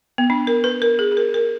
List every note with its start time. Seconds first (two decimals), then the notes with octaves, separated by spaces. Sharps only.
0.18 B3
0.30 D4
0.47 A#4
0.64 B4
0.82 A#4
0.99 G#4
1.12 G#4
1.17 A#4
1.34 A#4